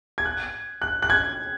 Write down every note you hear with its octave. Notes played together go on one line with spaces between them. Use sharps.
G#6
F#6
F#6
F#6
G#6